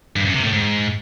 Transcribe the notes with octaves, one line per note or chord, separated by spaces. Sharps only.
G2
F#2
C3
A2
G#2